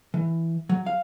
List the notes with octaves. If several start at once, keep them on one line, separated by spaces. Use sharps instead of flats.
E3
F#3
F5